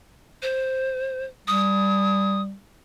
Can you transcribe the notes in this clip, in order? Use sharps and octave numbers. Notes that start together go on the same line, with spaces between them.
C5
G3 D#6